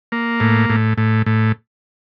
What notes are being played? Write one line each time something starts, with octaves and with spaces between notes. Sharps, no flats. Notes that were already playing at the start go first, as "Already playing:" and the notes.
A#3
A2
A2
A2
A2